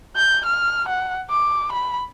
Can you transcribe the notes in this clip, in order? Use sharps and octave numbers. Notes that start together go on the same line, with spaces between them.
G6
F6
F#5
D6
B5